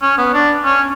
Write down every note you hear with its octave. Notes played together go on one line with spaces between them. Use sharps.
C#4
B3
D4
C#4